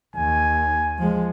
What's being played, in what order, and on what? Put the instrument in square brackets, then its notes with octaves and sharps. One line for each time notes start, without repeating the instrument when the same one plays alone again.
[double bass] D#2 [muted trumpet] G#5
[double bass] F3 G#3